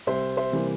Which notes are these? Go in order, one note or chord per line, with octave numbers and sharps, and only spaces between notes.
C2 C5 E5
C5 E5
C3 E3 G3 A#3